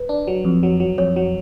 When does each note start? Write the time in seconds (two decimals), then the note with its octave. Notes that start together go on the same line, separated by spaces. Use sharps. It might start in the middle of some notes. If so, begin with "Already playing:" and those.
Already playing: B4
0.09 D4
0.27 F#3
0.45 F2
0.63 F#3
0.80 F#3
0.98 F2 C#5
1.16 F#3